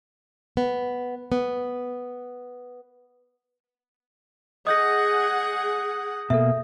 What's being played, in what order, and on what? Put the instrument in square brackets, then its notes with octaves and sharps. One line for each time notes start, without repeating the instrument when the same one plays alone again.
[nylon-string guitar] B3
B3
[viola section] G#4 F#5 [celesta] D#5 [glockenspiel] D#6 G6 A#6
[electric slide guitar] B2 A#3 [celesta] A4 E5